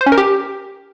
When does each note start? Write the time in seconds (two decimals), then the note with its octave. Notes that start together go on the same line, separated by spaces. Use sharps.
0.01 C5
0.06 C#4
0.12 A#4
0.18 G4